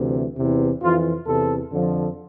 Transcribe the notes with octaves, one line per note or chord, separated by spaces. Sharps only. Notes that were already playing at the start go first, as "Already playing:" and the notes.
Already playing: D2 C3 E3
E2 C3 E3
F2 E3 F4
E2 C3 E3 A4
F2 D3 F3